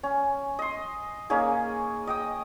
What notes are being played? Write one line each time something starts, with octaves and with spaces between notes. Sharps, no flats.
C#4
D#5 C6
A#3 C#4 D#4 G#4
D#5 G5 D#6